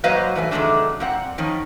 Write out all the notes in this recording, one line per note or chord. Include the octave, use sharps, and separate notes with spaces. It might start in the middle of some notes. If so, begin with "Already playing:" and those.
F#3 A#3 B4 C5 D#5 F5
A2 E3 B4 G#5
C3 D#3 F#3 G#3 A3 D4
A#2 C4 F#5
D#3 F3 C#4